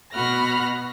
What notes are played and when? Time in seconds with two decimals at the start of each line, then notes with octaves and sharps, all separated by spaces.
0.12 B2 F#4 B5 F6 F#6 A#6